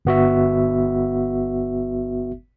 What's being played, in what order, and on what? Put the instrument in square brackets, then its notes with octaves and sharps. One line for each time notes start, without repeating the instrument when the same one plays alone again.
[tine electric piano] G1 B3 F#4 E5